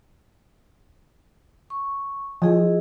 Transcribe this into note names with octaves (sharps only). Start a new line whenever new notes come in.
C#6
F3 E4 G#4 D#5